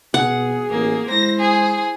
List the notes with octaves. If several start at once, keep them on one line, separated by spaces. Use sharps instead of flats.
B2 G#4 F#5
A1 A#3
G#3 E4 C5 A#6
G#4